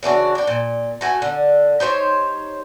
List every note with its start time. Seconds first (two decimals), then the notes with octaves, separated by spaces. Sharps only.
0.03 C#3 E3 D4 F#4
0.35 D4 G5
0.47 A#2
1.01 A3 F#4 G#5
1.22 D3
1.80 D#4 G4 C5 C#5